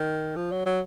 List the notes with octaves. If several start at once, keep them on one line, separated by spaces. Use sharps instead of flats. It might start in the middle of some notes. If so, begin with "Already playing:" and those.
Already playing: D#3
F3
F#3
F#3